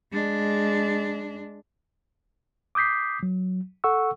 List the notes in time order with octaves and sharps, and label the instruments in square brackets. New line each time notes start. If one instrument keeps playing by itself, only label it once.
[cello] G#3 D4
[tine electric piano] D6 D#6 G6 B6 C7
F#3
A4 F#5 C#6 E6